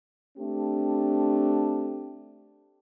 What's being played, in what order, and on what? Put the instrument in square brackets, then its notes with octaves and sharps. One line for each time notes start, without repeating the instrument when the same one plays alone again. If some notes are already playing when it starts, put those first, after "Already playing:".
[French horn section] A3 C4 D4 G4